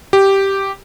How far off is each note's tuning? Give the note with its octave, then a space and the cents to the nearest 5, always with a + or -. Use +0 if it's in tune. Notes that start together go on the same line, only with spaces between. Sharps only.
G4 -5